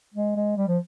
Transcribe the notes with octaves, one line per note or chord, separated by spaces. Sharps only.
G#3
G#3
G3
F3